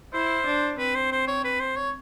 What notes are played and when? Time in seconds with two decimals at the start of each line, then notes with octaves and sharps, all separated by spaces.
0.13 E4 C5
0.46 D4
0.79 C4 B4
0.95 C5
1.12 C5
1.28 C#5
1.45 B4
1.60 C5
1.76 C#5